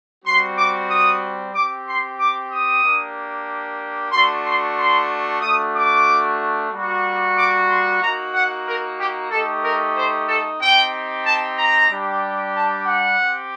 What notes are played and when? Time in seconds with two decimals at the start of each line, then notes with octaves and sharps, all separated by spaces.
0.23 G3 C4 F#4 C6
0.56 D6
0.88 D#6
1.53 C4 G4 D6
1.86 C6
2.17 D6
2.50 D#6
2.82 A#3 D4 G4
4.11 A3 D4 F#4 C6
4.44 C6
4.77 C6
5.41 A3 D4 F#4 D#6
5.74 D6
6.70 G3 A#3 F#4
7.36 D6
7.68 C6
8.00 A#3 D#4 F#4 A#5
8.32 F#5
8.65 A#4
8.98 G4
9.30 A3 D#4 G4 A4
9.63 A#4
9.95 C5
10.27 A4
10.59 C4 D#4 G4 G5
11.23 A5
11.56 A#5
11.89 G3 D4 G4
12.54 A5
12.86 F#5
13.18 C4 G4